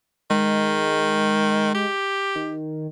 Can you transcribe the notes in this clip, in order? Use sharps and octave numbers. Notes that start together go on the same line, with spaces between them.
D#3 G#3
G4
D#3